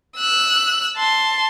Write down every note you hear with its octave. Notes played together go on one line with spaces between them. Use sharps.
E6 F#6
A5 C6